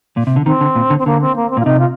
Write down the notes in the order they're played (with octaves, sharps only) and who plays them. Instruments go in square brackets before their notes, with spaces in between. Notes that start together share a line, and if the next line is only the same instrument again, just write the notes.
[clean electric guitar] A#2
C3
D3
[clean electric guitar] D#3 [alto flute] C4
[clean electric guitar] D3
A#2
D3
[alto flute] C4
[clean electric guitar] D3 [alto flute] A#3
[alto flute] C4
A#3
C4
[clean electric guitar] A#2 [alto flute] F4
[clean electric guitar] C3 [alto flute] D#4
[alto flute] F4